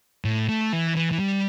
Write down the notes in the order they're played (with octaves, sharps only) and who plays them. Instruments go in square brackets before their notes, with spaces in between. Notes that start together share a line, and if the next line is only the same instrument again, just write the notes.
[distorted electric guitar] A2
A3
E3
E3
E3
G3